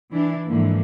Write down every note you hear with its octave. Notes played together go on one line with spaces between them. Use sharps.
E3 D4 E4
G#2 D3 E3 F3 A#3